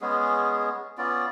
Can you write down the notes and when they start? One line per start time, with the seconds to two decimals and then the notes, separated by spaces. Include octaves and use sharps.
0.01 G#3 B3 C#4 G#4
0.98 B3 C#4 F4 D5